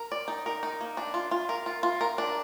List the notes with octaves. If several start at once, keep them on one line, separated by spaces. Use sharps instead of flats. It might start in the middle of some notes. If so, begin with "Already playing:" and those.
Already playing: A#4
D5
D#4
A#4
D#4
A#3
D4
F4
F4
A#4
F4
F4
A#4
D4